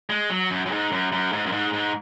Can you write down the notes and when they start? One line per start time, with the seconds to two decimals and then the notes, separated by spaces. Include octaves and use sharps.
0.10 G#3
0.30 F#3
0.51 F#2
0.66 F#2
0.72 G#2
0.92 F#2
1.12 F#2
1.33 G#2
1.46 F#2
1.52 G#2
1.73 G#2